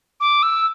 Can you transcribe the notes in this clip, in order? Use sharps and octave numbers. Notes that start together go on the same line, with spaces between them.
D6
E6